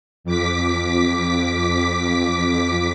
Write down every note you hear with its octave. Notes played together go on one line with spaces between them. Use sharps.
F2 D6 B6